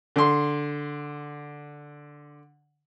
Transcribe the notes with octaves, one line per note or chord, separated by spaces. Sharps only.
D3 C6